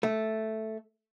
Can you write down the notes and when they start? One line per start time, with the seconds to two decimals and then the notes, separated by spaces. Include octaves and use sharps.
0.03 A3